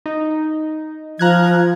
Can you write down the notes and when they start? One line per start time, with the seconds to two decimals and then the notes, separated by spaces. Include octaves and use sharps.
0.06 D#4
1.19 F3 A#5 F#6 G#6